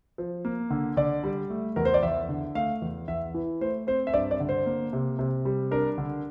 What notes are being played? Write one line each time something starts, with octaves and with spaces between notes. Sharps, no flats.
F3
A#3
D3
D3 D5
G3
A3
E2 A#4
C5
D5
E2 E5
D3
A3 F5
E2
E2 E5
E3
A3 C5
C4 C5
E5
G2 D5
D5
D3
C5
A#3
C3
C3
G3
D4 A#4
D3